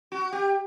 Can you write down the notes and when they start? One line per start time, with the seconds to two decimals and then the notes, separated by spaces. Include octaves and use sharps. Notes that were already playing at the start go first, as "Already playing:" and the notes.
0.12 F#4
0.32 G4